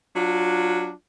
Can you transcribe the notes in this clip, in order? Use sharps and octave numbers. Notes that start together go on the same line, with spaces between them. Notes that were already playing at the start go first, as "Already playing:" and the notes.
F#3 D4 F4